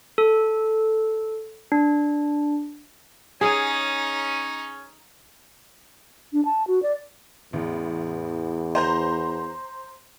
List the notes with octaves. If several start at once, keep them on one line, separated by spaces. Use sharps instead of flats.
A4
D4
C#4 D#4 G#4
D4
A5
F#4
D5
A1 E2
C5 A#5 G6